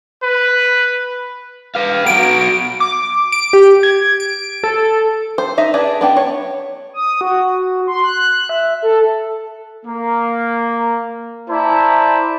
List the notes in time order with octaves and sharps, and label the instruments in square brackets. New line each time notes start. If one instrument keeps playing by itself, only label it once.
[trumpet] B4
[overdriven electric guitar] B4 F5
[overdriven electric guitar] F#3 B3 [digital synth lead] D7
[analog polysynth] D6
D7
G4
G#6
D7
A4
[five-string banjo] C5
D#4 E5
D4 G#4 B4
B3 D4 G5
C#5
[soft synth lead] D#6
F#4
C6
F#6
E5
A4
[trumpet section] A#3
E4 C5 D5 A5 A#5